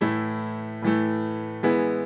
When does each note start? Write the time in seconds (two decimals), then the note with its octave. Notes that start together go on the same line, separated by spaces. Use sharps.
0.01 A2 E3 A3 E4
0.82 A2 E3 A3
1.63 E3 G#3 B3 E4